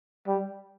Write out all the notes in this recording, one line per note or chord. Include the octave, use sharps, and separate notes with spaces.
G3